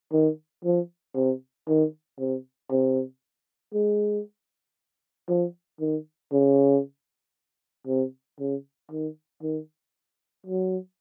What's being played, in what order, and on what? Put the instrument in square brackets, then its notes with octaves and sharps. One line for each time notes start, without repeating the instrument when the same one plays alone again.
[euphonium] D#3
F3
C3
D#3
C3
C3
G#3
F3
D#3
C#3
C3
C#3
D#3
D#3
F#3